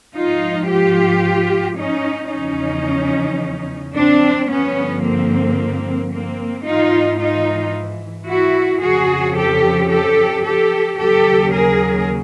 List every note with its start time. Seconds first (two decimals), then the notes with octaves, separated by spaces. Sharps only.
0.16 G#2 F3 D#4 F4
0.69 F4 G4
1.78 C#4 D#4
2.32 E2 C#3 F3 C#4 D#4
3.95 C4 D4
4.48 G2 D3 F3 B3 C#4
5.02 A#3 C4
6.11 A#3 C4
6.65 G#2 E3 D#4 F4
7.19 D#4 F4
8.28 E4 F#4
8.82 F2 C#3 F3 F#4 G#4
9.36 G4 A4
9.89 G4 A4
10.44 G4 A4
10.98 D#2 C#3 F#3 G4 A4
11.52 G#4 A#4